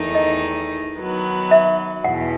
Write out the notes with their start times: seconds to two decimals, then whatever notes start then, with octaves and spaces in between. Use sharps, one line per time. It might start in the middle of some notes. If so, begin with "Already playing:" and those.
Already playing: E2 D#3 A3 D#4
0.15 D#5
0.96 D#3 F#3 B3
1.51 E5
2.04 E2 B2 F#5